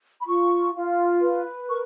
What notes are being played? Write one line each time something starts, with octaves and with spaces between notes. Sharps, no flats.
B5
F4 C#6
F4
B4
A#4 C#6